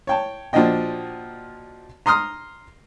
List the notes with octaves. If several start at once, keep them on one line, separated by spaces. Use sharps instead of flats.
C#5 G5 A5
A#2 F3 D4 F#4 D#5 G5
A#5 C6 D#6 F6